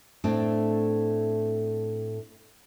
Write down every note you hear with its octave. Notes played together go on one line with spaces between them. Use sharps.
A2 A3 C4 D4